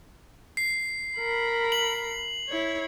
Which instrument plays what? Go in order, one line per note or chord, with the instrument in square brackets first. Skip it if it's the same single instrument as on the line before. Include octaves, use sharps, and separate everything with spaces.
[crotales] C7
[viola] A#4 B5
[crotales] F#7
[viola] E4 C#5